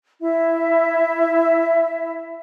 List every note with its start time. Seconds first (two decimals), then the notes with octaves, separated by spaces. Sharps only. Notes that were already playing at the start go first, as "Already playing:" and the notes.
0.22 E4 E5